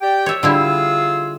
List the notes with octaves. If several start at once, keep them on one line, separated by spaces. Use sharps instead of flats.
G4 D5 G5
C#5 E5
D3 G3 E4 F4 G#4 E6